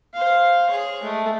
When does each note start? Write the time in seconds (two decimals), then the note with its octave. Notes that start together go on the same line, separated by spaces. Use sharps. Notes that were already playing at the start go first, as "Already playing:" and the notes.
0.14 C5 F5
0.70 G#4 C#5
1.03 G#3 A3